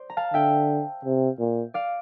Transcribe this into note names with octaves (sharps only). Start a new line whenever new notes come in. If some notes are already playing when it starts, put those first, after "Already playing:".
Already playing: C5 D5
A#5
F5 A5
D3 E5 G5
C3
A#2
D5 F5